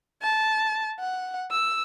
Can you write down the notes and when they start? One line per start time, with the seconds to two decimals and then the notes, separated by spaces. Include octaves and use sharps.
0.22 A5
1.00 F#5
1.51 E6